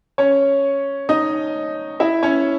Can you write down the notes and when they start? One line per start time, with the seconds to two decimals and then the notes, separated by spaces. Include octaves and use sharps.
0.18 C#4 C#5
1.09 D#4 D#5
2.00 E4 E5
2.23 C#4 C#5